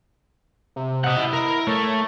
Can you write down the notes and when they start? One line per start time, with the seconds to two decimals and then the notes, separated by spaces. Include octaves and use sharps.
0.76 C3
1.04 C3 D#5 F#5
1.17 E4
1.33 A#4
1.67 A3 C#5